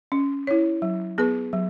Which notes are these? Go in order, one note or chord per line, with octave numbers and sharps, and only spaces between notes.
C#4
E4 C#5
F#3
B3 G#4 B4
F#3